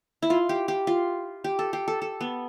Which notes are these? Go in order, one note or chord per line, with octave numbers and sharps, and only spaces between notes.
E4
F4
G4
G4
F4
G4
A4
G4
A4
A4
B3